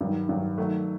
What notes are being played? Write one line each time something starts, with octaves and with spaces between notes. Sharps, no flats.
G2 D#3 F#3
G2 D#3 F#3
D#3 F#3 A3